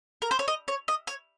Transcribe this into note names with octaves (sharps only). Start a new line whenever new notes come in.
A#4
C5
C#5
D#5
C#5
D#5
C#5